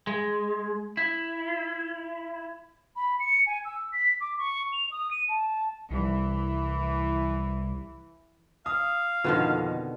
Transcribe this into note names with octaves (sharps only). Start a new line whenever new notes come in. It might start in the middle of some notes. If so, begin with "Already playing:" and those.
G#3
E4
B5
C#7
G#5
E6
B6
D6
C#6
F7
D#6
D#7
A5
C2 E3
F5 D#6
F2 B2 D3 D#3